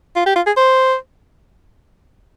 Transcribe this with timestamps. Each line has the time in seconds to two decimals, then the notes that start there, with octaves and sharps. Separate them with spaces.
0.16 F4
0.26 G4
0.36 F4
0.47 G#4
0.57 C5